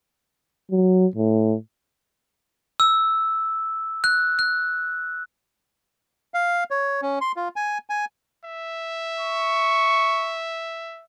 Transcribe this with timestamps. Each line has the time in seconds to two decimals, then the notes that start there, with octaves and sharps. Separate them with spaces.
0.71 F#3
1.16 A2
2.80 E6
4.04 F#6
4.39 F#6
6.34 F5
6.71 C#5
7.02 C#4
7.21 C6
7.36 F4
7.56 G#5
7.90 G#5
8.44 E5
9.19 C#6